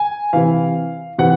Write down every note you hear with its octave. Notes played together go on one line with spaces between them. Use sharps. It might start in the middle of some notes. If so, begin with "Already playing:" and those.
Already playing: G#5
C3 E3 F5
C3 E3 F#5